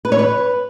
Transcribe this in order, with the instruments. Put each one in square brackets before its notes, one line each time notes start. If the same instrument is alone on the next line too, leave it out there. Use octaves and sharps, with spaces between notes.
[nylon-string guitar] B4
C#5
B4